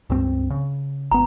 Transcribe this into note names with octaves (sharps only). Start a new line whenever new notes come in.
C#2 G2 C4
C#3
G#1 B3 A#5